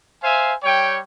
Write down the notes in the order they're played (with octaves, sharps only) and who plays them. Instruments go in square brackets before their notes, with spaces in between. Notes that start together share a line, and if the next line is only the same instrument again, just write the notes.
[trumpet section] C5 E5 F5 G#5
G3 C#5 G5